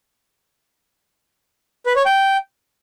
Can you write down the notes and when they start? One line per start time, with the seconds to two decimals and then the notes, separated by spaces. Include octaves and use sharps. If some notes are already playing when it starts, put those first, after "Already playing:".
1.86 B4
1.96 C#5
2.06 G5